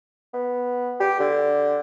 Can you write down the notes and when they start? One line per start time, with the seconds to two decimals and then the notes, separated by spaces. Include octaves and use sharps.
0.34 B3
1.00 G4
1.20 D3